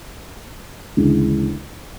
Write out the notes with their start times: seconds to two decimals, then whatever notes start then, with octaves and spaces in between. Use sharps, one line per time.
0.97 D2 C#3 E3 G#3